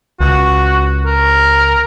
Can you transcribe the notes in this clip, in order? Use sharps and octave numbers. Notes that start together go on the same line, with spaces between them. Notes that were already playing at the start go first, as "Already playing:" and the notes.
C#2 F#4
A#4